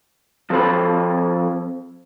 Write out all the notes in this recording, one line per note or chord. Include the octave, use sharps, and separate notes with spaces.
F3 C4 A4 C5 B5